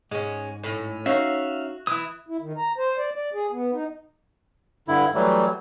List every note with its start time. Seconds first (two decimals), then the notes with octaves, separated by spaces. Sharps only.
0.11 G#2 G#3 C#4
0.64 A2 C#4
1.06 C#4 D#4 F#4 C#5 E5 F5
1.87 E3 E4 D#6
2.29 E4
2.41 D#3
2.58 A#5
2.78 C5
2.98 D5
3.16 D5
3.34 G#4
3.52 B3
3.73 D#4
4.88 G2 D3 E4
5.14 E3 F#3 G3 A3